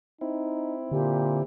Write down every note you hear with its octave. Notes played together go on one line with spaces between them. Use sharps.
C4 D#4 E4
A#2 D3 G4